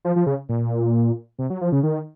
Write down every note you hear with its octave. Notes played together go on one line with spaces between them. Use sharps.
F3
F3
C#3
A#2
C3
F#3
F3
C#3
D#3